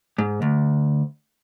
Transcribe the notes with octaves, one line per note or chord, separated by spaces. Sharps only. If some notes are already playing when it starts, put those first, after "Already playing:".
G#2
D2